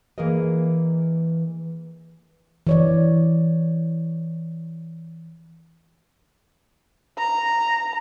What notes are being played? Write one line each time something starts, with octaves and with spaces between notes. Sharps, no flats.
E3 A#3 G#4 A#4 D#5
E3 C#5 D5
A#5